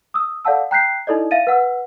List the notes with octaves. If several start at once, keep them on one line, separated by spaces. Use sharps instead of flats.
D#6 E6
A4 D5 F5 F#5 A5 E6
G5 A#5 F#6 G6 B6 C7
D#4 E4 A4 D5 D#5
E5 F5 A6 D#7
B4 F#5 E6